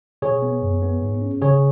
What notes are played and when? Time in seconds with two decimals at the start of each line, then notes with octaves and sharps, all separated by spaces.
0.22 B2 G#4 C#5
0.42 B3
0.62 F#2
0.82 B3
1.02 G#2
1.22 C#4
1.42 C#3 G#4 C#5